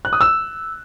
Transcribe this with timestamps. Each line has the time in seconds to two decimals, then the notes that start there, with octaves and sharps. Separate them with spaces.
0.05 F#6
0.13 D#6
0.21 E6